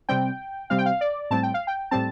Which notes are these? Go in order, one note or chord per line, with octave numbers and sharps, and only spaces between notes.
C3 G3 C4 G5
C3 G3 C4 F5
G5
F5
D5
A2 G3 C4 A5
G5
F5
G5
A2 G3 C4 A5